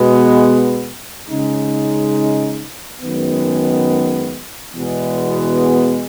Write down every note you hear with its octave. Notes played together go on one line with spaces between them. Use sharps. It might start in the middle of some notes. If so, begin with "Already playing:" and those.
Already playing: B2 G#3 B3
C#3 G#3 D#4
F#2 D#3 G#3 B3
E2 B2 G#3 B3